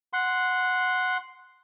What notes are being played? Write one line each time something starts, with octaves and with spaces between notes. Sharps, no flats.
F#5 C6